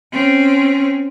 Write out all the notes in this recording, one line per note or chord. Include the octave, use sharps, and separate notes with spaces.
C4 C#4